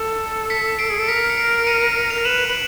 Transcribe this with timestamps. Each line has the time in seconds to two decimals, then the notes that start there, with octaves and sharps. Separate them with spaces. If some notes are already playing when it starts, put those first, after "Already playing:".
Already playing: A4
0.50 B6 C#7
0.79 C7 D7
0.90 G#4
0.99 A4
1.08 A#4 B6 C#7
1.30 C#7
1.37 C7 D7
1.67 C#7 D#7
1.81 C#7 D#7
1.96 C#7 D#7
2.10 D#7 F7
2.15 A#4
2.24 B4 E7 F#7
2.48 B4 F#7